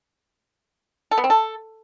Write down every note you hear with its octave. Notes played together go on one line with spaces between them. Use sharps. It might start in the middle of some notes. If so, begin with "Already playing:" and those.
A4
B3
C4
A4